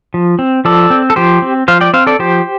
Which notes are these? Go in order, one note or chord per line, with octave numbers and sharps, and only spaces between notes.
F3
C4
F3 A4 D5
C4
A4
F3 G4 C5
C4
F3 C5 F5
D5 G5
C4 C5 F5
A4 D5
F3 G4 C5